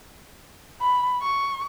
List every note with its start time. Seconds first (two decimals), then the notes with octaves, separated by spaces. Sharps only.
0.81 B5
1.22 C#6